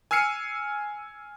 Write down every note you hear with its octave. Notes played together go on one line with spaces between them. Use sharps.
G#5 E6 F6 C7 C#7 D#7